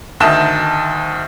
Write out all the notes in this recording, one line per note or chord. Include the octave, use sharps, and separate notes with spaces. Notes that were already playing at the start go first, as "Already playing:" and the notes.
D2 D#3 D#5 E5 A5 E7